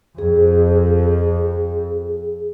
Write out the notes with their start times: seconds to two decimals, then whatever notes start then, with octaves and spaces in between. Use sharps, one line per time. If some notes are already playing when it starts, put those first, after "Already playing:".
0.18 F2 G#4